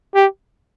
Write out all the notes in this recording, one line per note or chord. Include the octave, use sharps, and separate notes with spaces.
G4